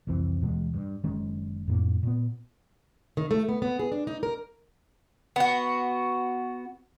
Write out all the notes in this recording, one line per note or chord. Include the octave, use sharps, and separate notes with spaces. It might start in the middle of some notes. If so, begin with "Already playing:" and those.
C2 F2 E3 C4
D#2 B2 E3 G#3
G2
F#1 D#3 G#3 C#4
F2 A2 A#3
A#2 B3
D#3
A3
B3
B3
G#4
D4
D#4
A#4
B3 F#4